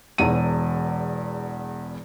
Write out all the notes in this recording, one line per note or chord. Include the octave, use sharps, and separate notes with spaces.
E1 E2 D#7